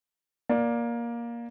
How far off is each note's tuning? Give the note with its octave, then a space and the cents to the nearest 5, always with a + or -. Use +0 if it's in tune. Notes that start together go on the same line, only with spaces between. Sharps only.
A#3 +15 D5 +0